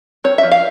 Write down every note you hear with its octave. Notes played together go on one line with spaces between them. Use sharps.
C4 C#5
E5
F3
F5